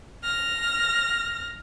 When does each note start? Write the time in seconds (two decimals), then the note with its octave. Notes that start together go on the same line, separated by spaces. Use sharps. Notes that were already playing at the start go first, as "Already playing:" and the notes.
0.23 F6 A#6